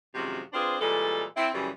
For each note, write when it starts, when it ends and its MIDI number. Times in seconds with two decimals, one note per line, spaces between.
0.15 0.41 42
0.15 0.41 48
0.15 0.41 51
0.15 0.41 53
0.15 0.41 56
0.15 0.41 66
0.53 0.76 60
0.53 0.76 62
0.53 0.76 65
0.53 0.76 68
0.53 0.76 71
0.53 0.76 72
0.81 1.24 46
0.81 1.24 52
0.81 1.24 55
0.81 1.24 56
0.81 1.24 69
1.36 1.49 60
1.36 1.49 64
1.53 1.69 42
1.53 1.69 49
1.53 1.69 52
1.53 1.69 55